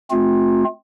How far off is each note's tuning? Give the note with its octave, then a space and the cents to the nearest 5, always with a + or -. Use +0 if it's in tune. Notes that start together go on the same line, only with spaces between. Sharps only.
A3 -30 C4 +0 F4 +25